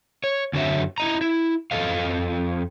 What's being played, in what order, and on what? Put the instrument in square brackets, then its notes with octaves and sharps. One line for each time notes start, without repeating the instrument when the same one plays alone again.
[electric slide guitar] C#5
F#2 D3 D4 F#4 C#5 E5
E4 D#5 A#5
E4
F2 F3 G#3 A4 D#5 F5